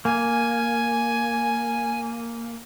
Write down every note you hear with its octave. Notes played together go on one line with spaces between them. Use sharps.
A#3 G#5